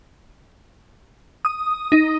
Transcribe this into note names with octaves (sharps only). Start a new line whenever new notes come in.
D#6
D#4